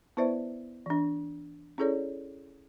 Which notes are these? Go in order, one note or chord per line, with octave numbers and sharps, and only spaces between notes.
B3 E4 B4 C5 D5 E5
E3 D4
C#4 E4 G#4 A4 C#5 D5